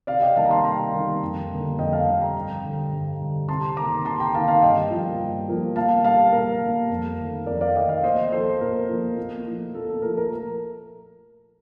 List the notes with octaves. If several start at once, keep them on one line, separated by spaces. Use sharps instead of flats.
C3 D5 F5
D#5 G5
D#3 G3 A#3 F5 A5
A#5
A5 C6
C3 G5 A#5
D#3 G3 A#3
F2
D3 G3 A#3
F2 D#5 G5
F5 A5
D3 G3 A#3
G5 A#5
G2
D3 G3
G2
D3 G3
C3 A5 C6
D#3 A#3 A#5 D6
C3 A5 C6
G5 A#5
D#3 A#3 F5 A5
F5 A5
G2 D#5 G5
F3 A#3
G2
F3 A#3
A#2 F5 A5
G3 A#3 F5 A5
A#2 A#4
G3 A#3
F2
D#3 A3
F2 A#4 D5
D5 F5
D#3 A3 D#5 G5
D5 F5
A#2 C5 D#5
F3 A#3 A4 C5
A#2 A#4
F3 A#3
A#2
F3 A3
A#2 A4
A4
F3 A3 A#4
A#4